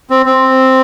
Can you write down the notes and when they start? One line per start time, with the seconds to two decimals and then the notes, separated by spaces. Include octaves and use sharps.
0.10 C4
0.26 C4